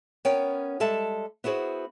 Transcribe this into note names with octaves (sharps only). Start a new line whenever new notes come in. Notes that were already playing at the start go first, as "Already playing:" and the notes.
B3 C#4 A#4 C#5 G5
G3 G#3 A4 E5 A5
B3 E4 F#4 G#4 C5